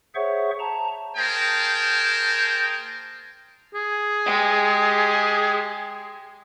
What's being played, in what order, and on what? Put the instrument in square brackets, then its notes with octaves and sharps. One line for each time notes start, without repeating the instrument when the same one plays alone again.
[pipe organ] G#4 C5 C#5 E5 F#5 C#6
A5 A#5
[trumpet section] A#3 G#4 A#4 C5 G5 A5
[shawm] G#4
[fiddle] G#3 G4